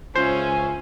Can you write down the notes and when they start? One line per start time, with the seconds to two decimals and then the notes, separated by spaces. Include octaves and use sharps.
0.16 C#2 C#4 F4 C5 E5 G#5